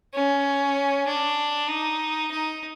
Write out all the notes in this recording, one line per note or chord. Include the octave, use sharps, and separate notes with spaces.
C#4
D4
D#4
D#4